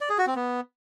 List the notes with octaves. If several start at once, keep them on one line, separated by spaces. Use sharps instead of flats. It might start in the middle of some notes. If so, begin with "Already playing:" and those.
D5
G#4
F#4
C4
B3